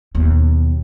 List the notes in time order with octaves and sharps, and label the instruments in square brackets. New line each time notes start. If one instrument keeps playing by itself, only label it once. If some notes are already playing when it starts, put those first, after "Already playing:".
[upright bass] D#2 B2